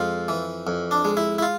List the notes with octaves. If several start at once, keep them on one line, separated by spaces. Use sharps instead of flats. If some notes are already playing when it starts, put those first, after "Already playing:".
Already playing: F2 G#3 F4
E3
F2
D4
G#3
E4
E4
F4